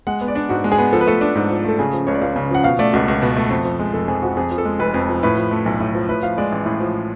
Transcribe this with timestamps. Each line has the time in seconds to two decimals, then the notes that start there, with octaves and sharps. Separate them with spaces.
0.07 G#3 F#5
0.21 B3
0.28 D5
0.35 D4
0.49 G#2 F#4
0.64 G#3
0.72 G#4
0.78 B3
0.93 F3 A4
1.01 B4
1.07 A3 A4
1.21 D4
1.35 G#2
1.50 F3
1.64 A3 A4
1.79 C#3 G#4
1.93 F3
2.07 C#2 C#5
2.14 D5
2.21 C#2 F5
2.36 C#3
2.51 F3 F#5
2.64 B2 F5
2.79 A3 D5
2.93 C#2 F#4
3.08 C#2
3.22 B2
3.37 A3
3.50 F2
3.65 F3
3.79 G#3
3.93 F1 A4
4.08 F2 G#4
4.22 F3 F#4
4.37 F2 G#4
4.51 F3
4.58 A4
4.65 G#3
4.79 F1 B4
4.94 F2
5.08 F3
5.23 A2 B4
5.37 F3
5.51 A3
5.66 B1
5.80 A2
5.95 F3
6.09 A2 B4
6.23 F3 F5
6.38 G#3 D5
6.52 A1
6.66 A2
6.80 F3